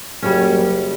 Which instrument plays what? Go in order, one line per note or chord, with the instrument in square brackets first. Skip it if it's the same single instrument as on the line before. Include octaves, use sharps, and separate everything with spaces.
[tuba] F#1 [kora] G3 C#4